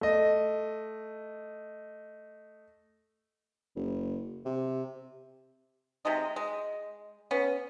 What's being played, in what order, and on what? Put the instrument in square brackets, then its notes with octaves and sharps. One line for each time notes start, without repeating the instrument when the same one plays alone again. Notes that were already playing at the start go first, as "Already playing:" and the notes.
[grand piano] A3 D#5
[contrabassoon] F#1
C3
[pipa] C3 F#3 G#3 D#4
G#3
B3 C#4